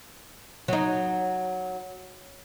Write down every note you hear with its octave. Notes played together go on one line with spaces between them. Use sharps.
F#3 D#4